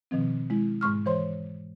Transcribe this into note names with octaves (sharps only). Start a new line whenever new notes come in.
B2 D#3 F3 C4
G#3 E4
G#2 G#3 C#6 F6
E3 C5 C#5 C6